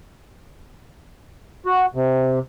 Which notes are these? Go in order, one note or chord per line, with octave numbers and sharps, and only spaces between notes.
F#4
C3